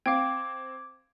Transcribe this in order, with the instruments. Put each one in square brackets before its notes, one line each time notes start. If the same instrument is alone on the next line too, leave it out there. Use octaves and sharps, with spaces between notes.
[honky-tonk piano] C4 [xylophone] F5 G5 [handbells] D6 G#6